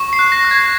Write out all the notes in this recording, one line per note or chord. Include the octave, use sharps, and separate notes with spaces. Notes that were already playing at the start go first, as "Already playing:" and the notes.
Already playing: C#6
C7
F#6
A#6
F#6
G#6